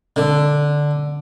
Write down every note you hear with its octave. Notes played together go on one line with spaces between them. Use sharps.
D3